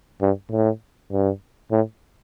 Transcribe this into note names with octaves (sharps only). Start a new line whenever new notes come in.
G2
A2
G2
A2